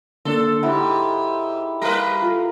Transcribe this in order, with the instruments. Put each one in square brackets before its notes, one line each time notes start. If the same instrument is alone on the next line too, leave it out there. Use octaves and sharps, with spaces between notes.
[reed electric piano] D3 A#3 D4 [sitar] A4 [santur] C6
[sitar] G#2 [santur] E4 G4 [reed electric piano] F#5
[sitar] G3 B4 [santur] A#4 F5
[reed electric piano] F4 A4